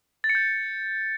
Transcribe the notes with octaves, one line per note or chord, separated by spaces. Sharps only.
A6
C#7
G6